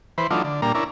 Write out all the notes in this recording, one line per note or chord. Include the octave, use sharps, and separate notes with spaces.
E3 B4 C5
E3 F#3 A3 D4 D#4 F4
D3
A#2 G3 A#3 D4 A#5
C#4 D4 E4 A#4